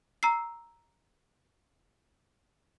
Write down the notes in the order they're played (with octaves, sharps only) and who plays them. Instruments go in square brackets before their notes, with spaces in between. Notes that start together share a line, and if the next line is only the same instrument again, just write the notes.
[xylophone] A#5 E6 C7